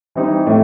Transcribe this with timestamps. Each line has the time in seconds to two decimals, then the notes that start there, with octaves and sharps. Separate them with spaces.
0.15 E3 G3 C4 D#4 G4
0.47 A2 E3 A3